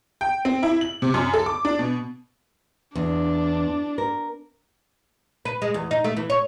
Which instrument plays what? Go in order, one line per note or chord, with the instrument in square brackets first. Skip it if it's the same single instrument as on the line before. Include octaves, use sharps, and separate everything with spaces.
[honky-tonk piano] G5
C4
E4
F#7
C3
F#2
A4
D6
D4
B2
[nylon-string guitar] E2 [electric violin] D4
[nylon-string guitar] A#4
[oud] B4
G#3
E2
D#4
A3
E3
C#5